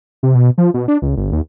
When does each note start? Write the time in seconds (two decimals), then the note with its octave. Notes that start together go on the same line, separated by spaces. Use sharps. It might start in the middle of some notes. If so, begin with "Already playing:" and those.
0.23 C3
0.35 B2
0.58 F3
0.74 B2
0.88 D4
1.02 C#2
1.17 G1
1.32 D#2